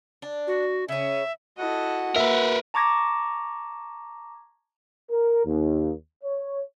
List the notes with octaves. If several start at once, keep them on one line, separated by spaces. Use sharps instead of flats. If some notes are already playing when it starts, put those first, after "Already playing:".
D4
F#4
C#3 C#4 E5
E4 F#4 A4 D#5 F#5
A#3 A#4 B4 E5
A5 A#5 C#6 D6 G#6 A#6
A#4
D#2
C#5